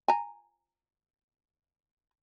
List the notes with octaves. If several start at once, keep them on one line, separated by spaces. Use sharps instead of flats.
G#5 A#5